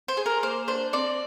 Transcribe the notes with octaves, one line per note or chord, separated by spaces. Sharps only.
C5
G#4
A#4
A#3 C5
D4 C5
C4 D5